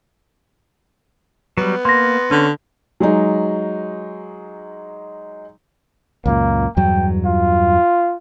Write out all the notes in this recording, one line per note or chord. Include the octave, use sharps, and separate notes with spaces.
F#3 G3 B3
A#3 C6 A#6
D3 C#4
F#3 G#3 D#4
C#2 F#2 A#2 A#3
E2 G2 F#3 G5
F4